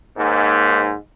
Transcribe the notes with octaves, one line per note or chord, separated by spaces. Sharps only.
D#2 G#2